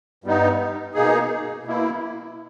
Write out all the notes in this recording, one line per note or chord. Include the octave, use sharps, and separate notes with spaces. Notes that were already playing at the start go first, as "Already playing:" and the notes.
G2 G3 B3 D#4
B2 A#3 D#4 G#4
B2 A#3 E4